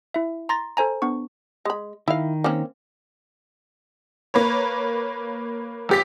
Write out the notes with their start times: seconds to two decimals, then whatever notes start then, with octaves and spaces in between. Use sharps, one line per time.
0.14 E4 E5
0.49 A#5 C6 A6 A#6
0.77 A4 C5 G#5 A#5
1.02 B3 D4 C#6
1.65 G#3 B5
2.08 D#3 E4 F5
2.44 A#3 C4 C#4
4.34 A#3 B4 C#5
5.89 A#1 G4 B6